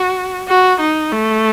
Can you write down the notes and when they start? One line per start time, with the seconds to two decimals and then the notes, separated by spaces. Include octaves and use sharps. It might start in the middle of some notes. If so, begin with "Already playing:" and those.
Already playing: F#4
0.48 F#4
0.80 D#4
1.12 A3